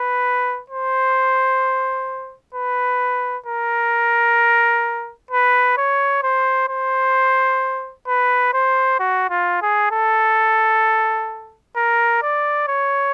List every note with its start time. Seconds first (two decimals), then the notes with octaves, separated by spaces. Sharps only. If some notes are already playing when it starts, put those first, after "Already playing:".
Already playing: B4
0.70 C5
2.54 B4
3.46 A#4
5.31 B4
5.77 C#5
6.23 C5
6.69 C5
8.07 B4
8.53 C5
8.99 F#4
9.30 F4
9.61 G#4
9.91 A4
11.76 A#4
12.22 D5
12.68 C#5